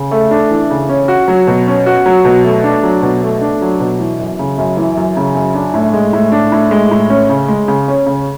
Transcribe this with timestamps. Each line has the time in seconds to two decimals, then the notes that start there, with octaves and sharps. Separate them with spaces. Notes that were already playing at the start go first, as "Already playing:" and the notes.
Already playing: C#3
0.11 A3
0.31 D4
0.50 E3
0.70 C#3
0.89 C#4
1.08 F#4
1.28 F#3
1.47 B2
1.68 C#4
1.86 F#4
2.06 F#3
2.25 B2
2.44 A3
2.64 D4
2.83 F#3
3.02 B2
3.22 A3
3.41 D4
3.62 F#3
3.80 B2
3.99 E3
4.20 F#2
4.39 C#3
4.58 F#2
4.77 E3
4.97 F#2
5.17 C#3
5.35 F#2
5.55 D4
5.74 A2
5.93 G#3
6.13 A2
6.32 D4
6.52 A2
6.71 G#3
6.91 A2
7.10 C#4
7.29 C#3
7.48 G#3
7.68 C#3
7.88 C#4
8.06 C#3